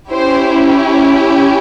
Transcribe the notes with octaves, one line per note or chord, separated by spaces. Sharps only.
C#4 E4 G4 C5